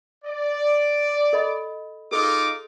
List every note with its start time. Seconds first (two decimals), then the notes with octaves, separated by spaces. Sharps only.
0.25 D5
1.33 A4 D#5 B5
2.12 D#4 F4 G#4 A4 D6